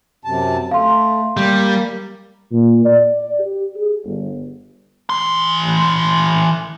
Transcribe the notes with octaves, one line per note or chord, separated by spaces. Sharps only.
F#2 C3 A5
A3 F5 C6
G3 A#3
A#2
D5
G4
G#4
G1
E3 C6